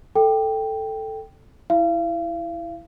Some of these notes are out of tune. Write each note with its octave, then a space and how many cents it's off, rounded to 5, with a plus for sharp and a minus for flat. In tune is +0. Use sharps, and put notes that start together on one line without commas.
A4 +0 G5 +0
E4 +0 F5 -40